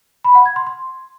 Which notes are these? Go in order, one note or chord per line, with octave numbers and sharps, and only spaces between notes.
B5
F#5
G#6
C6
C6